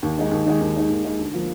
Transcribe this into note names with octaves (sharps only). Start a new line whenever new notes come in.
D#2
D#3 G#3 D#4
D#2
D#3 G#3 D#4
D#2
D#3 G#3 D#4
D#2
D#3 G#3 D#4
D2
D3 F3 A#3 F4